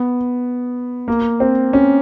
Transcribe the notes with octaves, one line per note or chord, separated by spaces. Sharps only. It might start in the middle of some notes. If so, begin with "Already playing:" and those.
Already playing: B3
A#3
C4
C#4